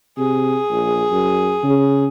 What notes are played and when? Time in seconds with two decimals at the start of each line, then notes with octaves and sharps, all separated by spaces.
0.18 C3 G#4
0.71 A#1
1.11 F#2
1.64 C#3